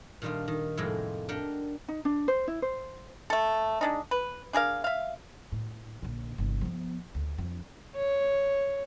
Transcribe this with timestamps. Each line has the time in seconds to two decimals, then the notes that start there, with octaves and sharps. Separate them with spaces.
0.22 A#2 D#3 G3 D4 F4
0.48 D#3
0.77 F2 A2 C3 F3 G#3 A#3
1.29 D4 G4 A#4 F#5 G5
1.88 D#4
2.05 D4
2.28 C5
2.48 E4
2.62 C5
3.30 A3 A4
3.81 G#3 D4 D#4
4.11 B4
4.53 D4 G#4 A#4 F5
4.84 E5 F5
5.52 A2
6.02 A#1 D3
6.38 G1 C2
6.61 F3 B3
7.15 D2
7.38 F2 D4
7.95 C#5